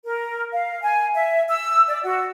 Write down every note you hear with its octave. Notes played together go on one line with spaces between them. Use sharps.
A#4
F5
G#5
E5
E6
D5
F#4